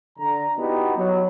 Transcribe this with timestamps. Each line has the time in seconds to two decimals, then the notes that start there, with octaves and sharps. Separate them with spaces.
0.18 D3 A#5
0.57 B3 D#4 E4 F#4 G4
0.97 F#3